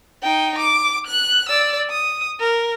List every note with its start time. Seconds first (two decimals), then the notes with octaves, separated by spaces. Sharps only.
0.23 D#4 G5
0.58 D6
1.07 F#6
1.49 D5 E6
1.90 D#6
2.40 A#4